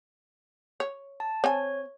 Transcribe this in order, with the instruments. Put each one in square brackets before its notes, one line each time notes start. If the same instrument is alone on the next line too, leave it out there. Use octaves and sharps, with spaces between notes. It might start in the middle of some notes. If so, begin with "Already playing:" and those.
[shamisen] C#5
[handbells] A5
[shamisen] C4 G#5 [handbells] C#5